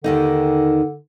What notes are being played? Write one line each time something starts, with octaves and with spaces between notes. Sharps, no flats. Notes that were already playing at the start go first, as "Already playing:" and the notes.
D#2 D3 D#3 D#4